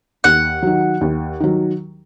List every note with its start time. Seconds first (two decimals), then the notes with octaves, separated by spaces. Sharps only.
0.24 D#2 F#5
0.63 D#3 F#3
1.01 D#2
1.40 D#3 F#3